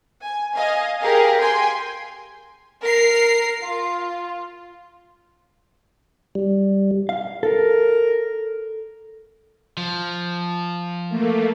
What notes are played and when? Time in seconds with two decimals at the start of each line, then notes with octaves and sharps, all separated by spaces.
0.24 G#5
0.55 D#5 F5 G#5
1.02 G4 G#4 A#4 F5
1.40 G5 G#5 C6
2.84 A#4 A#5 C7
3.60 F4
6.35 G3
7.09 F5
7.43 A4 A#4
9.77 F3
11.09 A3 A#3